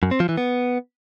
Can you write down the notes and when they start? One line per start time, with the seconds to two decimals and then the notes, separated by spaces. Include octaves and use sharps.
0.03 F#2
0.11 C4
0.20 F3
0.29 E3
0.37 B3